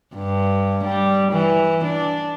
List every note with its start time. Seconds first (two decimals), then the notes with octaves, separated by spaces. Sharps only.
0.15 G2
0.84 G3
1.32 E3
1.84 D4